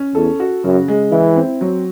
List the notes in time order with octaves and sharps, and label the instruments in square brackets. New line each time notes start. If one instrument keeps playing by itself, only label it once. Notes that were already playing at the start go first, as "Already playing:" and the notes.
Already playing: [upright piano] C#4
[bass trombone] E2 [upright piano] A4
[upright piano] F#4
[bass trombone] F#2 [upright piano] C#3
[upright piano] G#3
[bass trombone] E3 [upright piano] E4
[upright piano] C4
F#3